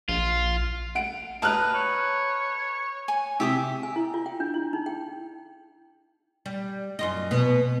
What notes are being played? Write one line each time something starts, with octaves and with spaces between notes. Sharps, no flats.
A#1 F4
F#5 D7
B4 D#5 A5 A#5 F6 F#6
C#5
G#5
C3 G4 E5 D6 D#6
G#5
E4
F4
G5
D4
E4
D#4
G5
G3
F#2 F4 D#5
B2 B3